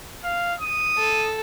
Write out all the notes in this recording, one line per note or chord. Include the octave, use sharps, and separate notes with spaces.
F5
D#6
A4